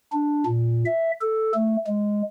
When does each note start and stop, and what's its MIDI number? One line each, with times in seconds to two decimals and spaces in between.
0.13 0.44 62
0.46 0.84 46
0.85 1.11 76
1.21 1.52 69
1.54 1.76 57
1.87 2.22 56